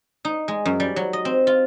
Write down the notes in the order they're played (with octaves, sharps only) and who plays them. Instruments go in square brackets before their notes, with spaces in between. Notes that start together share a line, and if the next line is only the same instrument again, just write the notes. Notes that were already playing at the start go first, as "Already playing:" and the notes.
[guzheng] D#4
G#3
F#2
G3
F#3
D#5
C4
F4